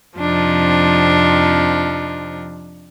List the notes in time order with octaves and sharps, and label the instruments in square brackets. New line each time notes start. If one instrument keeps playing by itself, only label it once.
[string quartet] F2 C3 F3 D4 D#4